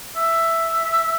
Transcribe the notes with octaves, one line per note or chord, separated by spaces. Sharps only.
E5